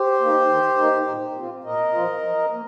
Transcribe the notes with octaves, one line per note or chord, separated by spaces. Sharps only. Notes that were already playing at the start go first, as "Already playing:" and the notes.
Already playing: G4 C5
A#3 D#4
D#3
A#3 D#4
A#2
F3 C4 F4
A#2 A#4 D#5
F3 C4 F4
F3
A#3